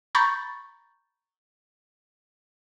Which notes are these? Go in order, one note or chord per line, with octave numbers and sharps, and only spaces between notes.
A#5 B5 C#6 G6 A6